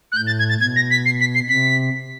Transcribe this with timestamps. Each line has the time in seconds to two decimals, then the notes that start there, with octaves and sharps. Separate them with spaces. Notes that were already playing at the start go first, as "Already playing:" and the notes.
0.12 F#6
0.15 A2 G6
0.27 A6
0.39 G#6
0.49 A6
0.60 B2 G#6
0.76 A#6
0.90 B6
1.05 C7
1.20 B6
1.35 C7
1.49 C3 B6